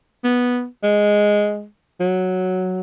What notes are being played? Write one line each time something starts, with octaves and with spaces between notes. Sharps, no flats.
B3
G#3
F#3